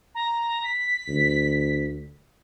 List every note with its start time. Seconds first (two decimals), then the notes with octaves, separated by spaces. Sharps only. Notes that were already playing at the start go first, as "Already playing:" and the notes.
0.15 A#5
0.64 B6
1.08 D2